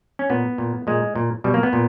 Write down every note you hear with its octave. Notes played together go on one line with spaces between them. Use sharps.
C#4
A#2 B3
A#2
A#2 G#3
A#2
B2 G3
A#3
B3
A#2